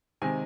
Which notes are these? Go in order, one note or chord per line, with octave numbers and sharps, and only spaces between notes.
C3 D#3 G#3 C4 G#5